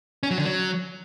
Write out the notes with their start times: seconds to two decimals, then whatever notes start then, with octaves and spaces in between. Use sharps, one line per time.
0.23 C#4
0.31 F#3
0.38 D3
0.45 F#3